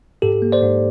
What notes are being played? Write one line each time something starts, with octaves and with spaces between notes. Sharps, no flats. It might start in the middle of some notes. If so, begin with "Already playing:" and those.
G#2 G4 A4
A#3
C5 D5
G#2